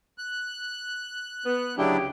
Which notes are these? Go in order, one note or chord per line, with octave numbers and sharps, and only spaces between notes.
F#6
B3
D2 C#3 F#3 D4 E4 G4